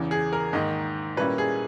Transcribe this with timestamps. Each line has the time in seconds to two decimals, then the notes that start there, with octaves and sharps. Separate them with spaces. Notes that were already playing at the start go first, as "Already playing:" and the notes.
Already playing: E2 C#3 E3
0.11 G#4
0.33 A#4
0.53 G#2 D#3 A#3 D#5
1.17 A#2 G3 A#3 C#4 E4 B4
1.38 G#4